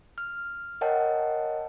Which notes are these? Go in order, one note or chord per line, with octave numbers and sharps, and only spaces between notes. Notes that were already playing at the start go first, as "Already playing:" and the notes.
F6
A#4 C#5 D#5 F#5 G5 A5